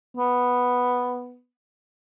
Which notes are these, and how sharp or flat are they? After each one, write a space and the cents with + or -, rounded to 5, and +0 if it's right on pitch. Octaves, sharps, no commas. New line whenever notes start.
B3 +0